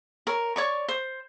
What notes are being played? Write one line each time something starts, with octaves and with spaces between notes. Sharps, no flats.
A#4 C#5
C#5 D5 C#6
C5